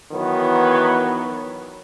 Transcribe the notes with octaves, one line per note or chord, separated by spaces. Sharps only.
D#3 E3 F#3 B3